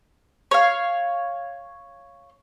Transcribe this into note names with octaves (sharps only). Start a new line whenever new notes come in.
C#5 F5